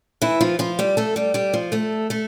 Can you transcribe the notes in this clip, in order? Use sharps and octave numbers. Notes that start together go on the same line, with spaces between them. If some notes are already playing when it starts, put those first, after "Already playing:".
E3 E4
F3 F4
F3 F4
G3 G4
A3 A4
G3 G4
G3 G4
F3 F4
A3 A4
A3 A4